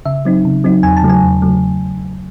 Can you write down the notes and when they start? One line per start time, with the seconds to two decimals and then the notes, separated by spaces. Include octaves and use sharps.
0.05 C#3 E5
0.25 F#3 C4 D#4
0.45 C#3
0.64 F#3 C4 D#4
0.83 E2 G#5
0.97 A5
1.02 C#3 F#3 A3
1.10 G#5
1.23 E2
1.42 C#3 F#3 A3